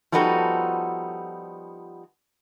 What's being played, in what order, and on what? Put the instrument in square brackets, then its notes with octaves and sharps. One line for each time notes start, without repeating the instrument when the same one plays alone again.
[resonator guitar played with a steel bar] F3 G3 B3 D#4 F#4 A4